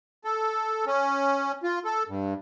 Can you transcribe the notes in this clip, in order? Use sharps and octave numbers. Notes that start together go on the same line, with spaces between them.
A4
C#4
F4
A4
G2